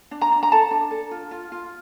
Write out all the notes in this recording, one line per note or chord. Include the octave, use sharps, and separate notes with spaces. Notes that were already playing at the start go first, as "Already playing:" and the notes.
D4
A#5
D4
A#5
A4 A5
D4
A4
F4
F4
F4